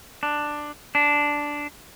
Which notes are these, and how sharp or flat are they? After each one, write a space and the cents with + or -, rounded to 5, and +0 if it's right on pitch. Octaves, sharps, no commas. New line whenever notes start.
D4 +10
D4 -5